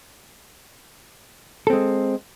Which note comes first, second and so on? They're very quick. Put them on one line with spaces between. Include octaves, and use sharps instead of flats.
A4 C4 G#3